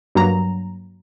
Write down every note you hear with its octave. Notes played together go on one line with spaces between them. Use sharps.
G2 F#3 A#3 A#5